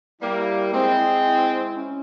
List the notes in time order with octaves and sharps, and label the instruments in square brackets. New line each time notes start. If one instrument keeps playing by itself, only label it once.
[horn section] G3 A#3 [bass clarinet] E4
[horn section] G#3 C4
[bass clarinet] E4
C#4